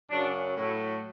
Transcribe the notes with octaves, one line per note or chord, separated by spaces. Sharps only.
F#2 C#3 F#3 D4
A2 F#3 A3 E4